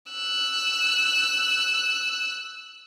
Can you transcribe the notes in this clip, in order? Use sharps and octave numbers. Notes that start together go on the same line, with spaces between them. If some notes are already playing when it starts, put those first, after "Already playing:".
E6 F#6